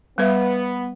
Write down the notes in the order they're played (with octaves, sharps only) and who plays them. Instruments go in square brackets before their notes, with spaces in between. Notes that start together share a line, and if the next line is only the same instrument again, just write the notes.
[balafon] G3 B4 E5 [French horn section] B3